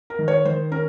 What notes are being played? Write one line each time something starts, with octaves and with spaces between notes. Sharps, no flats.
A#4
D#3
C#5
D#3 C5
C#4 A#4